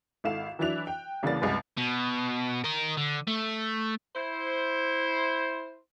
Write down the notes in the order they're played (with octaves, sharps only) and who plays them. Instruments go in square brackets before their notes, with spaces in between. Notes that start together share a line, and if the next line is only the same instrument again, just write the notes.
[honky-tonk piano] G#1 E4 A4 F5 E7
E3 F#3 D4 E4 F#6 F7
G5
C2 C#3 E3 A#3 D5 A6
C2 F#2 G#3 B4
[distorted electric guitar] B2
A#4 D#5
D3
A3
[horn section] E4 C5